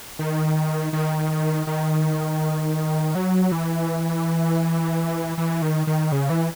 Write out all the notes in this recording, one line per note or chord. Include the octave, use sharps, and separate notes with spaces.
D#3
D#3
D#3
F#3
E3
E3
D#3
D#3
C#3
E3